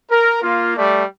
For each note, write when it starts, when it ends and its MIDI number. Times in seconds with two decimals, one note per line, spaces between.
0.11 0.42 70
0.42 0.74 58
0.42 0.74 65
0.76 1.04 55
0.76 1.04 57
0.76 1.04 74